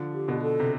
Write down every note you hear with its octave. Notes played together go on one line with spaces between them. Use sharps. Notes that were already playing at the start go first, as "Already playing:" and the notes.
Already playing: D3 F3
G4
B2 D3
A4
C3